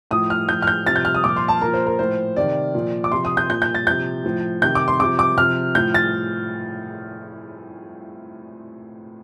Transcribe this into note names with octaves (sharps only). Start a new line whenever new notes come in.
A2 F3 D#6
F6
A2 F3 G6
F6
G6
C3 F3 A6
G6
F6
D#6
A#2 F3 D6
C6
A5
A#2 F3 A#4
C5
A#4
A2 F3 C5
C3 D#3 D5
A#2 F3
D6
C3 F3 C6
D#6
G6
A#2 F3 G6
G6
A6
C3 F3 G6
A2 F3
C3 D#3 G6
D6
C6
C3 F3 D6
D6
C3 F3 F6
A2 F3 G6
A6